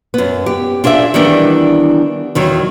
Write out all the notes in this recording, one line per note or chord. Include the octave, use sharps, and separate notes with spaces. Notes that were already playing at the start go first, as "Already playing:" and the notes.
F#2 B3
G4
D4 F4 G#4 D5 E5
D#3 E3 G3 B3 D4
E2 D#3 F#3